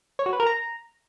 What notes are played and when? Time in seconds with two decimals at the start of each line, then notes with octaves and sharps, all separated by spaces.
0.19 C#5
0.26 F#4
0.33 B4
0.40 A#4
0.47 A#5